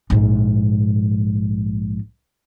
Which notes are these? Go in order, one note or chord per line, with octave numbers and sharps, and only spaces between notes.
A#1 G#2